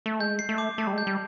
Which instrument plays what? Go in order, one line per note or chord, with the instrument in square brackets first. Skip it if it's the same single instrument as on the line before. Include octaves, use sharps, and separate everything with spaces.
[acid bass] A3
[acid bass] G#3 [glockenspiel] G6
[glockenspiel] C7
[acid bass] A3
[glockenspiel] D6
[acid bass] A3 [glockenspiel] A5
[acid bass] G3
[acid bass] G#3 [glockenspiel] G6
[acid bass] G3